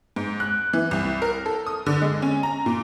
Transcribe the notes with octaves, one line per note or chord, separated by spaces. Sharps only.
G#2
F#6
E3
C2
A#4
A4
D#6
D3
G#3
C#4
A#5
A#2